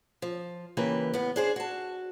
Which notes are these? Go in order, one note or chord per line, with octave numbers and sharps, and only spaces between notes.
F3
C#3 E3 A#3 G4 B4
A2 B3
D4 G#4 C5
F#4 A5